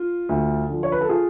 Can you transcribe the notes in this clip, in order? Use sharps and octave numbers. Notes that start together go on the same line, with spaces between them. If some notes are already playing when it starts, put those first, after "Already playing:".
Already playing: F4
D2
D3 F3
C#5
B4
A4
F4 G#4